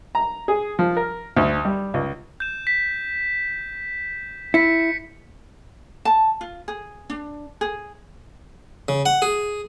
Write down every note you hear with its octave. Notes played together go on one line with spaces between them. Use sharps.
A#5
G#4
F3
A#4
D2
G3
C#2
G6 E7
B6
E4 B6 C#7
A5
F4
G#4
D4
G#4
C#3
F#5
G#4